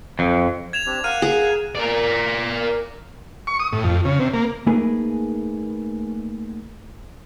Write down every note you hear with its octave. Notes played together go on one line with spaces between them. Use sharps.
F2
G#6 E7 F7
C4 D4 G4
A#4 F5 F#5 F6 D#7
G#4
A#4 D5
C#6
D#6
A2
F2
C#3
C3
A#3
A3 A#3 D#4 G#4 A#4 B4